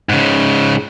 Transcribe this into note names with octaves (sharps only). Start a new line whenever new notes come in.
G#2 C#3